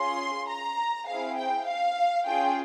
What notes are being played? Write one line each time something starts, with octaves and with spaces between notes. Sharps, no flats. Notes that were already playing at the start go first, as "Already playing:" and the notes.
Already playing: C#4 F4 G#4 C6
A#5
C4 E4 G#4 F5
G5
F5
C#4 F4 G#4 G5